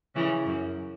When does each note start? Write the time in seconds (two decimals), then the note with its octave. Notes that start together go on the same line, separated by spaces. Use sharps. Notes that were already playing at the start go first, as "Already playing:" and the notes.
0.15 C#3 E3
0.46 F#2